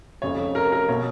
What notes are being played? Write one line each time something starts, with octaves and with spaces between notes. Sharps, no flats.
F1 F2 C#3 C#5
A#4
A#4
B2 C#5